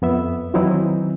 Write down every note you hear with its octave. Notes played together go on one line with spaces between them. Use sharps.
F2 B3 E5
D#3 E3 F#3 C4 D#4 E4